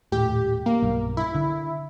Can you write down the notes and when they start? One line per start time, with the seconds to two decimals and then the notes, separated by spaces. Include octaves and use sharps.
0.12 D#1 A2 G4
0.66 A#3
0.82 B1 G2
1.17 E4
1.35 D3